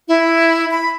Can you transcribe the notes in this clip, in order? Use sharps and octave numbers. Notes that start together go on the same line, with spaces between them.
E4
B5